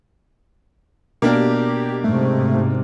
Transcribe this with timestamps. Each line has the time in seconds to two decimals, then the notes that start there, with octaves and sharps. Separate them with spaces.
1.22 B2 A#3 D4 G4 A#4
2.04 G#2 C3 A3